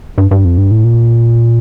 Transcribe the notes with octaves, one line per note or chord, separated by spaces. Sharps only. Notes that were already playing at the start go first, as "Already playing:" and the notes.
G2
G2
F2
G2
A2
A#2